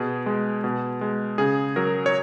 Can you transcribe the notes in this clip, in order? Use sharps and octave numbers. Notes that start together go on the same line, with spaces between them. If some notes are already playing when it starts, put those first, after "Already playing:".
Already playing: B2 G#4
G#3
B2
G#3
C#3 G#4
F#3 A#4
C#5